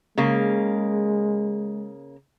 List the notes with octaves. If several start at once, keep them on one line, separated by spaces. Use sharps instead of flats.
C#3 G#3 A#3